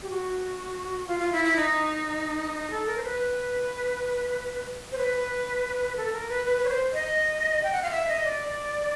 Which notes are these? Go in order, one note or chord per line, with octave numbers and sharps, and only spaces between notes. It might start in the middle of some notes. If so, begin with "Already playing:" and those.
G4
F#4
F4
F4
E4
E4
D#4
D#4
A4
A#4
C5
B4
C5
B4
A4
A#4
B4
B4
B4
C#5
C5
D#5
G5
F#5
F5
E5
D#5
D5